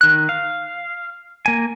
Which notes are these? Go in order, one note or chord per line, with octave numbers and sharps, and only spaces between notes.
D#3 F#6
F5
A#3 G#5